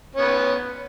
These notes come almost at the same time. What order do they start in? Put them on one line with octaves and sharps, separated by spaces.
C#4 B3 B4